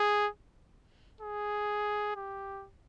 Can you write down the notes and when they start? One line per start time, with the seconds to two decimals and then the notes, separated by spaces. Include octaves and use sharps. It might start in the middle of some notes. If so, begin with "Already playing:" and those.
Already playing: G#4
1.21 G#4
2.16 G4